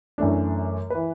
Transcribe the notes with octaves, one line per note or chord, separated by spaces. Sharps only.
F#2 E3 A3 D4
E3 B4